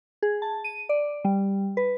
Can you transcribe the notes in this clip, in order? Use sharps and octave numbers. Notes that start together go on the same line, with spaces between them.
G#4
A5
D#7
D5
G3
B4